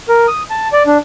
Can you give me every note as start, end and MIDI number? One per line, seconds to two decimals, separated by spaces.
0.09 0.26 70
0.28 0.43 87
0.50 0.68 81
0.73 0.83 74
0.86 0.98 62